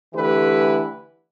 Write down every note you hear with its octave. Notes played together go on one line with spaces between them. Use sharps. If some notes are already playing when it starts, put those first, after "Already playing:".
D3 E3 A3 E4 G4 B4